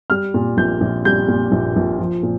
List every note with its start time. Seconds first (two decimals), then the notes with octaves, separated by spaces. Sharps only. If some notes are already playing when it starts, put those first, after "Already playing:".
0.10 G3 F6
0.34 A#2
0.57 A#1 G6
0.81 A#1
1.05 G3 G6
1.28 A#2
1.52 A#1
1.76 A#1
1.99 F3
2.23 A#2